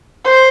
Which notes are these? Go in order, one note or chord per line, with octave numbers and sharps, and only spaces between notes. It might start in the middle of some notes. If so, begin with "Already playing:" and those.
C5